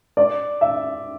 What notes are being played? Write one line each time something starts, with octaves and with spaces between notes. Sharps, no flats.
D5
E5